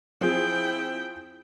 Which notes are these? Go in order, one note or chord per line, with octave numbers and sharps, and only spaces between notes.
F3 C4 E4 G#4 G5